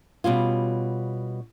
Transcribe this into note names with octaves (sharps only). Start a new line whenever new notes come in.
B2 G3 C#4 F4